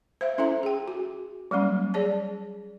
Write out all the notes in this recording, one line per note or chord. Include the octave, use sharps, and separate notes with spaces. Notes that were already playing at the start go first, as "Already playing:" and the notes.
C5 E5 F5
C#4 E4 A4 E5 A#5
G#4 G5
F#4
F#3 G3 A#3 C#4
G#4 C#5 D5 A5